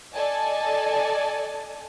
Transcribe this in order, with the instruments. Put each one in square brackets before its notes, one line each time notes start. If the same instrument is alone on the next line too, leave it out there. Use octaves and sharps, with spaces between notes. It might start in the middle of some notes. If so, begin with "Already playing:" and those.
[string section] A4 D5 D#5 G#5 A5